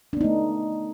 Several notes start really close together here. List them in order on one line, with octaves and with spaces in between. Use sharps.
D4 B3 D#4 A3